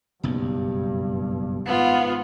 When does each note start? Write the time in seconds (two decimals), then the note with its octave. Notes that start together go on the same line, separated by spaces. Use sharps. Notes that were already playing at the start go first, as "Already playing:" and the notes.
0.23 F#1 B1 G2
1.66 G#1 G#2 B3 F4